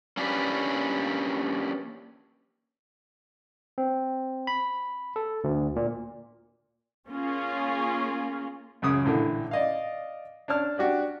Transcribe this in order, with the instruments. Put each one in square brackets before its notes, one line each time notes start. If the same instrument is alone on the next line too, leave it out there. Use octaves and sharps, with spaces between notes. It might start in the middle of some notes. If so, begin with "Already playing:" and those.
[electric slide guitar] A#3 C#4 D4 G4 A#4 B4
[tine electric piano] C4
B5
A4
D2
A#2
[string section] A#3 C#4 F4 G#4
[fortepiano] C#2 F#2 C#3 D#6
A#1 A2 D3 E3
D5 D#5 F5
D4 C#5 A5 F6
D4 F#4 G4 D5